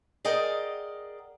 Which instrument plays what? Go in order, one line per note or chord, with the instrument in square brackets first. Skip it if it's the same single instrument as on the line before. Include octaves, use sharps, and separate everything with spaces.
[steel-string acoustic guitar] G#4 A#4 D5 D#5 F#5 G5